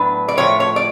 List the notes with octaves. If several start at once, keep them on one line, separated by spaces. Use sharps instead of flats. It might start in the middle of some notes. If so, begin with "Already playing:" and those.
Already playing: A2 F#3 B3 D4 B4
D5
A2 F3 A3 C#5
C#5
D5